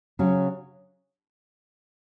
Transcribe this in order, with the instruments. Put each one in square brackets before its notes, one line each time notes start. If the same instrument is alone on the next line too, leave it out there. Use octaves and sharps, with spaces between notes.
[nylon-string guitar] C#3 F#3 C#4